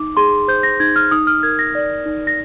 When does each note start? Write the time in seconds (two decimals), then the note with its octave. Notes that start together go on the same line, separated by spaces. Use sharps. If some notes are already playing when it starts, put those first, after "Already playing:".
Already playing: D#4 D6
0.17 G#4 C6
0.48 C5 G6
0.63 A#6
0.80 D#4 G#6
0.96 F6
1.11 D#4 D#6
1.27 F6
1.43 A#4 G#6
1.59 A#6
1.75 D5
2.06 D#4
2.27 A#6